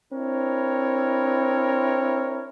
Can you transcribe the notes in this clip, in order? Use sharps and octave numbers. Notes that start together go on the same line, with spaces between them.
C4 D4 E4 A#4 C#5